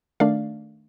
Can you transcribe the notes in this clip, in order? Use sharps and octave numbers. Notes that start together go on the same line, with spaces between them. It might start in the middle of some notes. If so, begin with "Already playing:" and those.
D#3 A3 D4 D5 F5